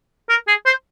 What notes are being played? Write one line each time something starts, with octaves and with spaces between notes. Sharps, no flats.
A#4
G#4
C5